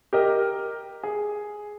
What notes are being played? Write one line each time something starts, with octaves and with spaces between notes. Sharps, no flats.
G4 A#4 D#5
G#4